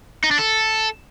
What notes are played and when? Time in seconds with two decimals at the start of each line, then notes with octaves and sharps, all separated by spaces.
0.24 D#4
0.31 D4
0.39 A4